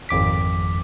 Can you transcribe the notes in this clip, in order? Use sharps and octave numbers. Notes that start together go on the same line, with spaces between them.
G#1 F2 D6 B6